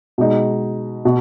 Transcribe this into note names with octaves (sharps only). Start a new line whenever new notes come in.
B2 G#3 D#4
B2